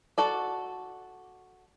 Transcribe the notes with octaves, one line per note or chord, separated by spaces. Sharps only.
F#4 A4 D5